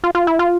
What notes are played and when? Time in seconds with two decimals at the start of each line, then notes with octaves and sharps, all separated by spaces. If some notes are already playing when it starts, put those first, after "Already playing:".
0.04 F4
0.15 F4
0.27 E4
0.39 F4